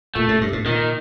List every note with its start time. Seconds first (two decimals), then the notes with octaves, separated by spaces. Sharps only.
0.15 A#2 A3
0.28 A2
0.41 G2
0.53 A2
0.65 A#2 D#3